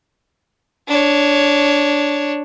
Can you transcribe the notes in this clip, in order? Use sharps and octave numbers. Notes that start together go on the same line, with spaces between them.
D4 C#5